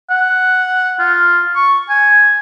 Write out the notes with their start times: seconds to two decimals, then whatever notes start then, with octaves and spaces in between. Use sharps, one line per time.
0.10 F#5
0.99 F4
1.56 C#6
1.89 G#5